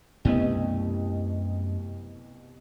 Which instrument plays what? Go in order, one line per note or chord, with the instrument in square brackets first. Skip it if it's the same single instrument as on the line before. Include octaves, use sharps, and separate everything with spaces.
[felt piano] C2 B2 D#5 [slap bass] F#2 A3 C#4